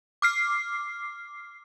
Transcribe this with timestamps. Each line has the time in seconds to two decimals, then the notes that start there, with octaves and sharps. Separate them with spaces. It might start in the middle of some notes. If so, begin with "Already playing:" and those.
0.22 D6 F6 C7